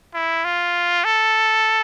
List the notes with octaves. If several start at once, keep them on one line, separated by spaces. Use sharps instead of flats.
E4
F4
A4